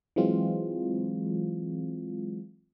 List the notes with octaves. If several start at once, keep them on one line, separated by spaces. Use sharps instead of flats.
E3 F#3 G#3 C4 F4